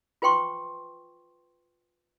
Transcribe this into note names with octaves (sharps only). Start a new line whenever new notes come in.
F4 B4 C5 G5 C6 C#6